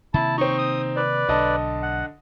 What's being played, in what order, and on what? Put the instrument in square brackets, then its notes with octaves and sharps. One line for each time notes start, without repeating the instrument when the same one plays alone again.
[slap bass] C3 D#3 A#3 [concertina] E4 A5
[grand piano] C4 D#4 [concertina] C#6
[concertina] D#6
B4 D5
[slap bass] B1 [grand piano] D3 D#5 A5
[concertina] F#5